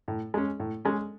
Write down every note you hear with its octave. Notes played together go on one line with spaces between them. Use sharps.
A2
G#3 C#4
A2
G#3 C#4